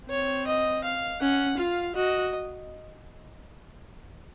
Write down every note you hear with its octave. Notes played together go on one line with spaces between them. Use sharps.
C4 C#5
D#5
F5
C#4 F#5
F4 F5
F#4 D#5